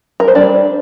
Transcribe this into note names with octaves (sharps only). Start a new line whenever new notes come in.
A#4
C5
G3 D4 D5